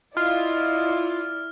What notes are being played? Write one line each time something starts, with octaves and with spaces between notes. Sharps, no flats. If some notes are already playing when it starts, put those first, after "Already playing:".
E4 F4 D5 D#5 F6